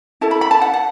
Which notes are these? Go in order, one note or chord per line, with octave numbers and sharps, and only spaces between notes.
E4 A4 A5
B5
B5
A5
F#5
F#5